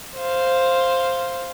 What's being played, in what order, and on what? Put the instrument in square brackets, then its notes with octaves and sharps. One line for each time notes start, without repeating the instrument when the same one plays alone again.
[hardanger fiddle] C5 F5